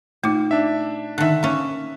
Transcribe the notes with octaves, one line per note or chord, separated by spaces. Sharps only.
A#2 A3 D#4
D4 E5
D3 D#3 E5 F#6
A#3 C#4